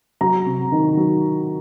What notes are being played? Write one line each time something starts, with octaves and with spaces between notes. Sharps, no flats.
F#3 A#5
C3
D#3
F#3